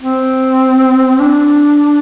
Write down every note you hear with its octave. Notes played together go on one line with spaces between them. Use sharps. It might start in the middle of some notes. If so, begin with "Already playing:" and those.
C4
D4